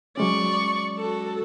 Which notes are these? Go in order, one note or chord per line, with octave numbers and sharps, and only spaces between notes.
F#3 G#3 C#4 D5 C#6
F#4 A4